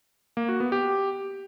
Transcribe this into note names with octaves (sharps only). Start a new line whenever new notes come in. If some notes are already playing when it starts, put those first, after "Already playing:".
A#3
F#4
B3
G4